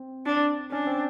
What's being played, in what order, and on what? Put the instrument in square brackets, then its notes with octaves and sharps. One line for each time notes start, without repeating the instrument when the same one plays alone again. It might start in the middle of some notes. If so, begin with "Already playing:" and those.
Already playing: [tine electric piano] C4
[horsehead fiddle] D4
[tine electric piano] C#4 [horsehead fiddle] D4
[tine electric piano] C4